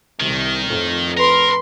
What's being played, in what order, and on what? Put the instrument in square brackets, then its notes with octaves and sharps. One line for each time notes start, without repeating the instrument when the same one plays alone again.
[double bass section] C2 C3 [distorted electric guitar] D#3
[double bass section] F2 A2
[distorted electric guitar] A#4 [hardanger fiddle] B4 C6